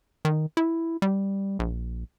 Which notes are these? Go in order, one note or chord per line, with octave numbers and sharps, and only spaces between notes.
D#3
E4
G3
A#1